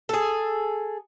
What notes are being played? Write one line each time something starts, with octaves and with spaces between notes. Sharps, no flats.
G#4 A4